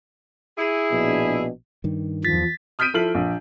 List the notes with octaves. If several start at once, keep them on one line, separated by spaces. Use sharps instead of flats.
E4 G#4
A#1 B2 D4
G2 D#3
E2 F3 A6 B6
D#6 F6 G6 B6 D7 D#7
F3 E4 A4 F6 C7 F#7
A#1